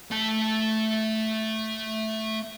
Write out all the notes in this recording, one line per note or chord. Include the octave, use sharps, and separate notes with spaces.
A3 A5